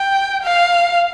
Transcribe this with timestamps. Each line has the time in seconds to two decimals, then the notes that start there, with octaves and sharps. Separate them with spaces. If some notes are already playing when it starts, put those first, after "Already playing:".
Already playing: G5
0.43 F5